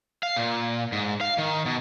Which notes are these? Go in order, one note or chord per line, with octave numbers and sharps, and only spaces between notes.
F5
A#2
G#2
F5
D#3
B2